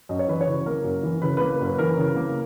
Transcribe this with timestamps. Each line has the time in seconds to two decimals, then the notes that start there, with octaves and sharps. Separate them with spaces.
0.09 F#2 D#5
0.19 C#5
0.28 E3 B4
0.41 C#5
0.46 C#3
0.66 A#3 A#4
0.84 F#2
1.03 E3
1.22 C#3 B4
1.37 A#3 B4
1.51 B4
1.61 F#2 B4
1.78 E3 A#4
1.97 C#3
2.17 A#3